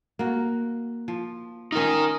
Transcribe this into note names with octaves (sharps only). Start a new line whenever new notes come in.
A#3 F#4
F3
C#4 D#4 F4 A#4